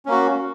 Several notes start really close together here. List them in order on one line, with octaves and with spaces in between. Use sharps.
C#4 A#3 F#4